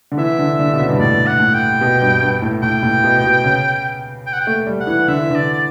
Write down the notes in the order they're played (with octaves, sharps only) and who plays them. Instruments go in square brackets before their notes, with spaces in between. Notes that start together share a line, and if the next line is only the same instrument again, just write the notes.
[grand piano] D3
[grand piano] E3 [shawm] E5
[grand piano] D3
D3
B2
C#3
G2
[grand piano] A2 [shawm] D5
[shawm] F#5
[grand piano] A2
[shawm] G5
[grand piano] B2
G2
G2
A2
[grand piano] A2 [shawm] G5
[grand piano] A2
B2
B2
C#3
[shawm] G5
F#5
G5
[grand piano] A3
G3
[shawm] F#5
[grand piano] E3
[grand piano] D3 [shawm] E5
[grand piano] E3
[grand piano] D3 [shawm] D5
[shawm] D5